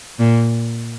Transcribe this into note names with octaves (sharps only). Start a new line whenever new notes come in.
A#2